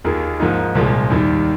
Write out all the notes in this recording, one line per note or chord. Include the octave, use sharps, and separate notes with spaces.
D#2 D#3 A#3 F4 G#4
G#2 F3 A#3 D#4
C2 A#2 F3 G#3
D#2 D#3 G3